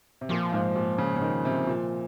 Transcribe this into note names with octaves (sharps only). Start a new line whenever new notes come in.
C3
A#2 F3
G#2
A#2
C#3
C#3
D#3
C3
A#2